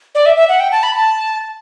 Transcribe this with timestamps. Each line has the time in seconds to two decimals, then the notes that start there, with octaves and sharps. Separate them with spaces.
0.15 D5
0.26 E5
0.37 E5
0.49 F#5
0.60 G5
0.72 A5
0.83 B5
0.95 A5